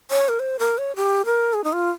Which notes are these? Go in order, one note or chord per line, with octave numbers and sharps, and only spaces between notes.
C#5
A#4
C5
A#4
C#5
G4
A#4
G#4
D#4
F4